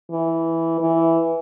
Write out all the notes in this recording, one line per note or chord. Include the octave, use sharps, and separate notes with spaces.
E3
E3